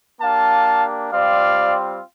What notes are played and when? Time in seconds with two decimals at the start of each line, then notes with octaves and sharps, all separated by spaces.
0.20 A#3 D4 G4 F5 A5
1.11 G3 C4 F4 D5 F5